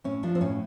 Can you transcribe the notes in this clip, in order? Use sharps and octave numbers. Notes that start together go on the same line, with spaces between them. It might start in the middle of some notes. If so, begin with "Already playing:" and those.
A2 C#4
F3 D4
C4
A2 C#4